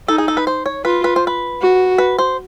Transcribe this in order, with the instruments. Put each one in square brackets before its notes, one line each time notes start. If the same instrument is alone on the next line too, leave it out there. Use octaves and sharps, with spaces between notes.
[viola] D#4 [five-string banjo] A4
[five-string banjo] G#4
A4
B4
C5
C#5
[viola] F4 [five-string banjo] B4
[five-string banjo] B4
C5
B4
[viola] F#4
[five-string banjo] B4
C5